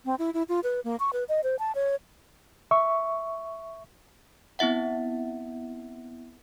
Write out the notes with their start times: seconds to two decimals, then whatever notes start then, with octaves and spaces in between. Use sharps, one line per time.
0.05 C4
0.19 E4
0.34 E4
0.49 F4
0.64 B4
0.84 A#3
1.00 C#6
1.13 B4
1.29 D#5
1.43 C5
1.59 A5
1.75 C#5
2.71 E5 C#6
4.59 B3 C4 E4 E5 F#5